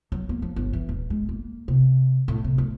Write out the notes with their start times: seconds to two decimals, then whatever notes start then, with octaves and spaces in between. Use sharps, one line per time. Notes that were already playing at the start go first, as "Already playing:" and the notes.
0.12 F#3
0.29 A#3
0.42 F3
0.56 G1
0.73 E3
0.89 D#1
1.10 G#3
1.29 A#3
1.68 C3
2.28 A2
2.44 C3
2.58 A2